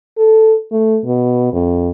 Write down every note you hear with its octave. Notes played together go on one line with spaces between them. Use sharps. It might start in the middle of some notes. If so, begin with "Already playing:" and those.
A4
A3
B2
F2